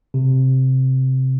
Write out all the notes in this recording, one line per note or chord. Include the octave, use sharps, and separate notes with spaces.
C3